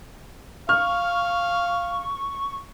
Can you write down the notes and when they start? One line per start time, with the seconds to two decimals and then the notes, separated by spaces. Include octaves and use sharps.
0.69 F5 C#6 F6